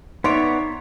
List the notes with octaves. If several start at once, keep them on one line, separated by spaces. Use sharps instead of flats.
B3 D#4 C#5 D5 E5 A#5 C6